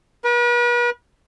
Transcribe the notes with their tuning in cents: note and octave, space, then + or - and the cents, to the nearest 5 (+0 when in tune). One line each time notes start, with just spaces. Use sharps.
B4 -40